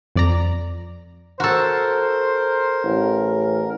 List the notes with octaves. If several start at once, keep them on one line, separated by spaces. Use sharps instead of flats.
F2 D5 A#5
F#4 A4 A#4 C5
A1